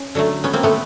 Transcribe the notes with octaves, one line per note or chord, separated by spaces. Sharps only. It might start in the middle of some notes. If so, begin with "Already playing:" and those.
Already playing: C#4
D3 F#3 A3
B3 C#4
A#3 C4
A3 B3